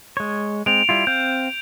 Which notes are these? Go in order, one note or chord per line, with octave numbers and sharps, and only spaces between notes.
G#3 C#5
G#3 C4 D7 F7
G3 E4 F4
C4 F5 G6